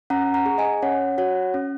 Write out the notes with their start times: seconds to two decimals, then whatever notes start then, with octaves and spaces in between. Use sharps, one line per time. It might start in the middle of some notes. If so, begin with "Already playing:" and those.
0.10 C#4 F#5 A#5
0.34 F#5 A#5
0.46 G#4
0.58 D#5 G#5
0.82 C#4 C#5 F#5
1.18 F#4 C#5 F#5
1.54 C#4